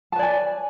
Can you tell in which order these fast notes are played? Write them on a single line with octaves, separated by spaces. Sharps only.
A5 B4 D5 G#5